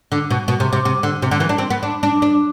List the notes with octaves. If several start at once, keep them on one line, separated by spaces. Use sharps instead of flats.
D3
B2
B2
C3
C3
C3
D3
C3
D3
E3
D4
C4
B3
D4
D4
D4